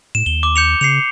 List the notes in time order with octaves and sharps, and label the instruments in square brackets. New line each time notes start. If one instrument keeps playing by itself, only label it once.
[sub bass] A2 [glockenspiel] E7
[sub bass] D#2 [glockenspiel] G7
[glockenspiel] D6
G6 C#7 F7
[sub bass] C#3 [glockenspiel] C7 C#7 F7